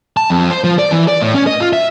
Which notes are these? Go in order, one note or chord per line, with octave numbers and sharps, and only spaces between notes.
A5
F2
C5
F3
D5
E3
D5
A2
C#4
D#5
F4
E5